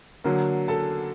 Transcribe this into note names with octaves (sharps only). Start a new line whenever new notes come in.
D3 F#3 A#3
A4 A5